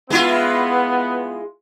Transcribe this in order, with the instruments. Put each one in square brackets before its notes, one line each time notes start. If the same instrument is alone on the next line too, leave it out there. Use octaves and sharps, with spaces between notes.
[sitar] G#3 E4 F4 [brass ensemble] B3